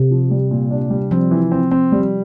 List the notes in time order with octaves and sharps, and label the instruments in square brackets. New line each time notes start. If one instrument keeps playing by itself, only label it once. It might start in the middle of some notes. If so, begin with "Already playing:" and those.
Already playing: [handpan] C3
[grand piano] F3
G3
A#2
D4
G3
[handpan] F3 [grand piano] C4
[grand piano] E3
C4
C4
G3